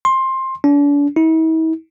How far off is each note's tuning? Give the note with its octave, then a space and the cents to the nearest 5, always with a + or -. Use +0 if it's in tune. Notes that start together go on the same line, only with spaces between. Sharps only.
C6 +15
D4 -40
E4 -45